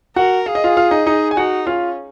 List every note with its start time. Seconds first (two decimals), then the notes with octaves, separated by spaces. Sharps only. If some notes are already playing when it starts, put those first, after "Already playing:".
0.16 F#4 A#4 F#5
0.46 G#4 F5
0.55 D#5
0.64 F4 F5
0.77 F4 F5
0.91 D#4 D#5
1.06 D#4 D#5
1.31 G#5
1.36 D#4 F#4 F#5
1.67 C#4 F4 F5